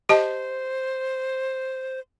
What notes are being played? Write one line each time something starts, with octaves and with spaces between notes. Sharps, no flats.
G4 C5 D#5 A5